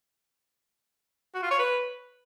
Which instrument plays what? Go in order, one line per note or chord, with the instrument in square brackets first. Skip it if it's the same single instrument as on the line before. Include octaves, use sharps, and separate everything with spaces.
[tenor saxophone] F#4
F4
C#5
B4